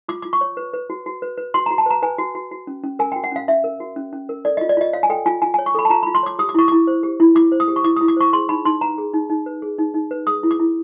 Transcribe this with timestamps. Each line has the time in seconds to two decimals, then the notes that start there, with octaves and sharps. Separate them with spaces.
0.08 F4 D6
0.22 F4 D6
0.33 C#6
0.41 C#5
0.57 B4
0.74 B4
0.90 F#4
1.06 F#4
1.22 B4
1.37 B4
1.54 F#4 C6
1.66 F#4 A#5
1.78 A5
1.86 B4 A#5
2.02 B4 G#5
2.18 F#4
2.35 F#4
2.51 F#4
2.67 C#4
2.84 C#4
2.99 A#4 G#5
3.12 F#4 G5
3.24 F#5
3.32 C#4 F5
3.48 C#4 E5
3.64 A#4
3.80 F#4
3.96 C#4
4.13 C#4
4.29 A#4
4.45 A4 D5
4.57 F4 D#5
4.69 D5
4.77 F4 D#5
4.93 C#5 F5
5.03 G#5
5.09 A4 G5
5.26 F4 G#5
5.42 F4 G#5
5.54 C#5 G#5
5.66 C#6
5.75 A4 B5
5.85 A5
5.90 F4 A#5
6.03 F4 B5
6.15 C6
6.23 C#5 D6
6.39 G4 D#6
6.49 D6
6.55 E4 C#6
6.68 E4 D6
6.87 C5
7.03 G4
7.20 E4
7.35 E4 D6
7.52 C5
7.60 D#6
7.68 G4
7.76 C#6
7.84 E4 D6
7.96 E4 D#6
8.08 D6
8.17 C5 C#6
8.33 G#4 C6
8.49 D#4 B5
8.65 D#4 C6
8.81 B4 A#5
8.98 G#4
9.14 D#4
9.30 D#4
9.46 B4
9.62 G#4
9.79 D#4
9.94 D#4
10.11 B4
10.27 G#4 D#6
10.43 E4
10.51 D6
10.60 E4